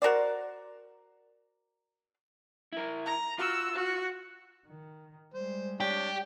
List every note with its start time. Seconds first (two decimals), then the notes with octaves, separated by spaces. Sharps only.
0.02 F#4 A#4 C5 D5
2.73 E4 A#4
3.05 A#5
3.38 F4 F#4 E6
3.75 F#4
4.66 D#3
5.34 G3 G#3 C5
5.80 D4 G4 C#5